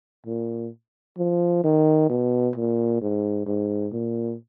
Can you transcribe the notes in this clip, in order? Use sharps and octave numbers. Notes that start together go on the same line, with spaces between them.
A#2
F3
D#3
B2
A#2
G#2
G#2
A#2